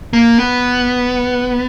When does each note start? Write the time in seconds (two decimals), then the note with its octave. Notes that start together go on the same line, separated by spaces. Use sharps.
0.13 A#3
0.38 B3